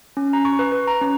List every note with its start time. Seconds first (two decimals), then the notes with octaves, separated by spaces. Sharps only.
0.17 C#4
0.33 A#5
0.45 C#6
0.59 B4
0.72 B4
0.87 A#5
1.01 C#4